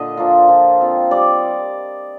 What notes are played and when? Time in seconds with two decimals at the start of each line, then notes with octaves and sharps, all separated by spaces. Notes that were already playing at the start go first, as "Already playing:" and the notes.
Already playing: A#2 D3 D#5
0.17 F3 A#3 F4
0.48 F3
0.81 C4 F4
1.11 G3 D5